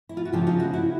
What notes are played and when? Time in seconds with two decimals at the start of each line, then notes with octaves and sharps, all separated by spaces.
0.09 E4
0.17 F4
0.25 F#4
0.32 C#3 F3 F4 G4
0.47 D#4 F4
0.60 E4 F#4
0.73 E4 F#4